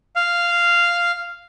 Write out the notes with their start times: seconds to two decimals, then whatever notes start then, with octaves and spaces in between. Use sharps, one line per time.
0.16 F5